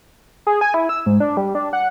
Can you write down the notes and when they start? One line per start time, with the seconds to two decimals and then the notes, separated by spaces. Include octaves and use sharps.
0.47 G#4
0.61 G#5
0.74 E4
0.89 E6
1.06 G#2
1.20 D4
1.37 G3
1.55 D4
1.73 F#5